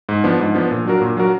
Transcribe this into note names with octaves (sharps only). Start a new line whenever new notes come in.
G#2
F3 B3 D4
G#2
F3 B3 D4
A#2
F#3 D4 F#4 A#4
A#2
F#3 D4 F#4 A#4